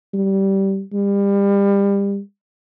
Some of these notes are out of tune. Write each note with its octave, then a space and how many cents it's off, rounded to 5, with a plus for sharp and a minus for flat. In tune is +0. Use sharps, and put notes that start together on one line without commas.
G3 -15
G3 +30